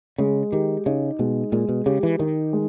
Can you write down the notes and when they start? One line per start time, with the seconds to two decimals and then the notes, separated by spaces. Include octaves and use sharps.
0.18 C#3 G#3
0.52 D#3 G4
0.86 C#3 D#4
1.19 B2 G#3
1.52 A#2 G#3
1.69 B2
1.86 C#3 G4
2.03 E3
2.19 D#3 D#4
2.53 G#3